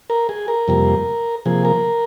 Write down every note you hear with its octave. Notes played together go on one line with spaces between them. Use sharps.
A#4
G#4
A#4
F2 C3 G3 A#3
C3 F3 A#3 G#4
A#4